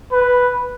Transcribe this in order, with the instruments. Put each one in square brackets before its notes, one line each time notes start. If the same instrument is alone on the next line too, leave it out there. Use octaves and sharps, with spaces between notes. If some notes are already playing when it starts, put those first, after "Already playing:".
[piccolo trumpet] B4